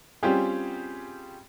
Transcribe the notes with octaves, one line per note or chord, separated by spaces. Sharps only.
G3 C4 C#4 F4 G4 G#4